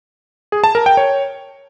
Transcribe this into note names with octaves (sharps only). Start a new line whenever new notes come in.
G#4
A5
A#4
G5
C#5